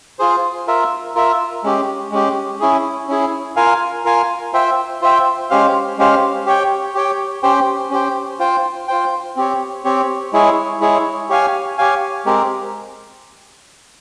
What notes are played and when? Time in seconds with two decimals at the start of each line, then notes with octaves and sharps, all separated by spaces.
0.19 F4 G#4 C5
0.67 F4 A#4 E5
1.15 F4 A#4 E5
1.64 G#3 C#4 G4
2.12 G#3 C#4 G4
2.60 C#4 E4 G#4
3.08 C#4 E4 G#4
3.57 F4 A#4 F5 G#5
4.05 F4 A#4 F5 G#5
4.53 F4 C5 E5 G5
5.01 F4 C5 E5 G5
5.50 G#3 C#4 G4 C5 F5
5.98 G#3 C#4 G4 C5 F5
6.46 G4 C#5 G5
6.95 G4 C#5 G5
7.43 C#4 G4 C5 G5
7.91 C#4 G4 C5 G5
8.39 F4 C5 G5
8.88 F4 C5 G5
9.36 C4 G4 C#5
9.84 C4 G4 C#5
10.32 G#3 E4 G#4 C#5
10.80 G#3 E4 G#4 C#5
11.29 G4 C#5 F5 G#5
11.78 G4 C#5 F5 G#5
12.25 G#3 C4 G4 A#4